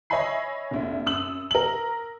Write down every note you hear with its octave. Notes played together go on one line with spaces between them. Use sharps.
C#5 D#5 E5 G#5 B5 C7
F1 A#1 E4
F#2 D#6 E6 F#7
A#4 F#7